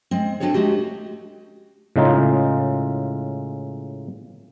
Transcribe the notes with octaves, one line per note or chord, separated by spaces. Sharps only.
G#3 C4
C4 D4 F#4 A4 C#5
G#3 A3 F#4 G4
A2 C#3 G#3 D#4 F4